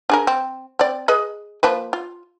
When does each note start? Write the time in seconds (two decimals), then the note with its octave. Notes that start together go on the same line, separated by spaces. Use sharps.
0.10 D4 G#4 A#4
0.27 C4
0.79 C4 D5
1.08 G#4 B4 D#5
1.63 F3 A#3 B4
1.93 F4